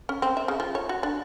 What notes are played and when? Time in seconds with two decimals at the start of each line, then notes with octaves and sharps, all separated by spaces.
0.09 C#4
0.22 C4
0.37 E5
0.48 C#3
0.60 F3
0.75 C#5
0.89 F#4
1.03 D4